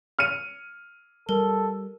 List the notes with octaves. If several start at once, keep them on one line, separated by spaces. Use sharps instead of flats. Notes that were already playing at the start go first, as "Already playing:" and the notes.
F6 C#7 D#7
G3 A4 A#4